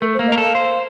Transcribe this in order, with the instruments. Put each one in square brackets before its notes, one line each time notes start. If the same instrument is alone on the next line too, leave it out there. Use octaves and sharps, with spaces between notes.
[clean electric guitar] A3 [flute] A#4
[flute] C5
[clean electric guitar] A#3
[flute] D#5
[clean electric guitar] A#4
[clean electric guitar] A4 [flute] F5
[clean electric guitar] C5